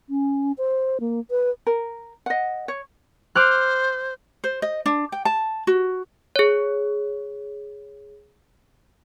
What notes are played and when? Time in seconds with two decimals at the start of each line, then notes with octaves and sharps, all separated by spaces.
0.09 C#4
0.58 C5
1.00 A#3
1.30 B4
1.67 A#4
2.26 D#5 F#5
2.68 C#5
3.35 C5 D6 F6 F#6
4.44 C5
4.62 D#5
4.86 D4
5.12 G5
5.25 A5
5.67 F#4
6.36 G#4 C#5